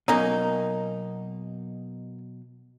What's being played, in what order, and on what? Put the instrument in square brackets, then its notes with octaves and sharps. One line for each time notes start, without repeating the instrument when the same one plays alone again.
[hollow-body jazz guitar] B2 F#3 [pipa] A#3 C#4 D#4